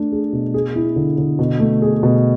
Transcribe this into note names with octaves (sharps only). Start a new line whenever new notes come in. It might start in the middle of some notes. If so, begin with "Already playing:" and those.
Already playing: A3 D4
G#4
B2
G#4
E4
D3
D3
B2
A3
G#4
B2